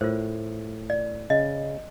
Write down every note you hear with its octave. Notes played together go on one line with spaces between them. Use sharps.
A2 F4 A#4 C5
D5
C#3 D#5